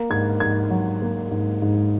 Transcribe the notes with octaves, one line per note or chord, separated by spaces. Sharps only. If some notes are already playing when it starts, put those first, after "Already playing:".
Already playing: A#3
G#2 G#6
G#2 G#6
F#3
A#3
G#2
G#2